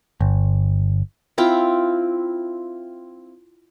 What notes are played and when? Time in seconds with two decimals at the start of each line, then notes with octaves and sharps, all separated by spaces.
0.21 G1
1.38 C4 E4 F4 G5